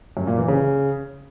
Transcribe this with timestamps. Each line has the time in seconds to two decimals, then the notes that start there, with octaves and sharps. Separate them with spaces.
0.17 F#2
0.27 A#2
0.38 E3
0.48 C#3